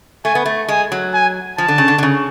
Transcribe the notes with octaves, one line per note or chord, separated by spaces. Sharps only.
A3 G#5
B3
A3
G#3 G#5
F#3
G#5
F3 A5
D3
C#3
D3
D3
C#3